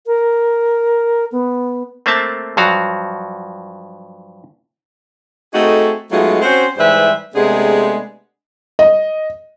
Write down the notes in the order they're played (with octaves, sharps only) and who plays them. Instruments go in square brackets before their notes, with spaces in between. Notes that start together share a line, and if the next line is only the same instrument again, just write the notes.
[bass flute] A#4
B3
[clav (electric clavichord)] A3 A#3 C4 E5 A5
G2 F3 F#3 F#4 F5
[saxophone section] A3 C4 D#4 F#4 G#4 A4
F#3 G#3 A3 B3 D#4 F4
C4 C#4 F#4 C5
G#2 E3 G3 B4 C5 E5
C3 G#3 A3 B3 D4 G#4
[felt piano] D#5